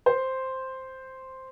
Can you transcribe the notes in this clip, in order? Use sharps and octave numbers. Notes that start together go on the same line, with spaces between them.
C5